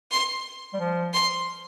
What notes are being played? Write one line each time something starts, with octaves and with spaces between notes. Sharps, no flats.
C6
G3
F3
C6